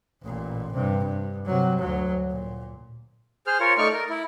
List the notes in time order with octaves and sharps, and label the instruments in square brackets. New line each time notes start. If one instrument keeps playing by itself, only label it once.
[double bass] A1 A#2
G2 C3
G2
C3 F#3
D2 F#3
A#2
[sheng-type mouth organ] G#4 C5 F6
F4 A#4 C#5
A3 D#4 D5 C#6 F6
A#4
E4